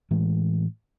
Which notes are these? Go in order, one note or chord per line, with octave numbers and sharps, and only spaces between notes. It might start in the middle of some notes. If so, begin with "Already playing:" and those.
A2 E3 G#3